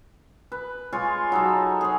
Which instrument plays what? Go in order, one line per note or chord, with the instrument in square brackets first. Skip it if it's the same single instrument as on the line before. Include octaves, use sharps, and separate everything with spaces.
[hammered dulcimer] B4
G#3 F4 C#5
F#3 D#4 A4
G#4 C#5